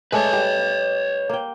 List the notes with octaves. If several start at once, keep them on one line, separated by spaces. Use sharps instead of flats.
G#3 A3 D4 B4 C#5
G3
A#3 G5